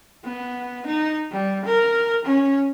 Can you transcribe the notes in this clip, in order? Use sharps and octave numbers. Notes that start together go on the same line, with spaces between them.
B3
D#4
G3
A#4
C#4